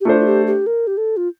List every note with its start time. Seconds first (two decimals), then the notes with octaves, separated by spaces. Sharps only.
0.01 G4
0.05 A3 D4 F4 A4 C5
0.20 F4
0.26 G4
0.47 G4
0.67 A#4
0.87 G4
0.97 A4
1.17 F4